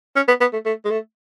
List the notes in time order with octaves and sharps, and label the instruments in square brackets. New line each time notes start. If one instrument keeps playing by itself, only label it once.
[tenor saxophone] C#4
B3
B3
A3
A3
G#3
A3